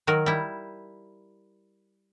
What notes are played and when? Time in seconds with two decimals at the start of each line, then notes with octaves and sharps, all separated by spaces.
0.07 D#3 F#3 A#4
0.26 G3 E4